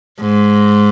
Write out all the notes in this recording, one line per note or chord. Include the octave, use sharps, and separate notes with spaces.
G#2